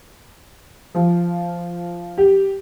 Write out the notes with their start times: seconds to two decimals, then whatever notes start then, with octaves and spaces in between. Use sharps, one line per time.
0.95 F3
2.18 G4